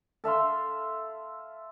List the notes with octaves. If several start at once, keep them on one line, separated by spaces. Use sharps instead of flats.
A4 E5 F5 C6